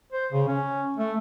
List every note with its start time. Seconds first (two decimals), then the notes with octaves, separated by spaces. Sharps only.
0.12 C5
0.32 C#3
0.48 C#4
0.97 A3